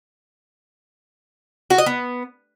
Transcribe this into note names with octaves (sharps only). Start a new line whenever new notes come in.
F#4
D#5
B3